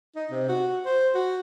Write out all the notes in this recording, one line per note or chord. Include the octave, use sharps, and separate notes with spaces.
D#4
C3
F#4
C5
F#4